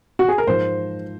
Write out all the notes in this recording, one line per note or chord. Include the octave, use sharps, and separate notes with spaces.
F#4
G#4
A#4
G#2 F3 C5